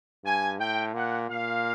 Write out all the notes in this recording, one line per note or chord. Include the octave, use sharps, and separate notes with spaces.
G2 G#5
A2 G5
A#2 F#5
A#2 F5